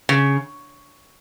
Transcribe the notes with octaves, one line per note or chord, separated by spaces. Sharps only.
C#3